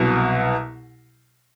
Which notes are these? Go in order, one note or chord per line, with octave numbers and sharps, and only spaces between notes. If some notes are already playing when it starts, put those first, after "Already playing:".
Already playing: C2 B2 F#3